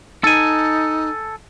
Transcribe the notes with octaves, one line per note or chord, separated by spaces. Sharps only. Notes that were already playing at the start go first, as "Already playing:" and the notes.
D#4 A4 G#5